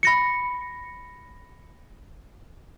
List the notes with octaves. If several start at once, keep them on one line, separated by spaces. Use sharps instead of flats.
B5 A#6 C#7